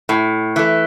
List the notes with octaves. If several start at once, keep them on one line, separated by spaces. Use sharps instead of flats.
A2
E3 A3